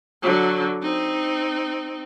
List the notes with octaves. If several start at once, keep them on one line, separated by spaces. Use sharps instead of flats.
D3 F#3
C4 D#4